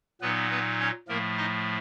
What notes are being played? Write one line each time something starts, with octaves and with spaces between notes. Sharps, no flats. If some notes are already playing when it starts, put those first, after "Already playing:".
A#2 F#3 B3 D#4 B4
B3 B4
C#4 C#5
A2 F3 A3 A#3 A#4
D#4 D#5